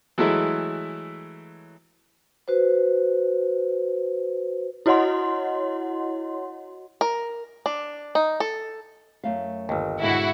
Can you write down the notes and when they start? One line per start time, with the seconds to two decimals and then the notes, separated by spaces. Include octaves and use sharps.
0.18 E3 F#3 G#3 A3 E4
2.48 F#4 B4 C5
4.86 E4 F#4 C#5 D#5 F#5 C6
7.01 A#4
7.66 D4
8.15 D#4
8.40 A4
9.24 F#2 A3 F5
9.69 G1 D#2
10.01 G#2 B2 D3 E4 F#4